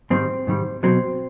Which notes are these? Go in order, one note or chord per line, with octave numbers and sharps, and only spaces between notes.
G#2 D#3 G3 C4
G#2 D#3 G3
B2 F#3 C4